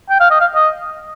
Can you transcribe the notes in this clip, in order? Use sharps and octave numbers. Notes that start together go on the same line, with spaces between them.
G5
F5
D#5
F5
D#5